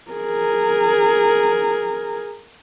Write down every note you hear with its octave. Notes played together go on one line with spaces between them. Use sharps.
G#4 A#4